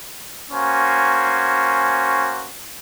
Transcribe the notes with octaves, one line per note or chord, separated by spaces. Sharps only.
A#3 C#4 F#4 C5 G#5